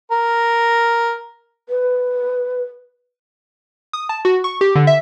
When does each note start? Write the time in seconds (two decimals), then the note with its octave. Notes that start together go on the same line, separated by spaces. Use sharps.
0.11 A#4
1.69 B4
3.93 D#6
4.09 A5
4.25 F#4
4.44 C#6
4.61 G4
4.75 D3
4.87 E5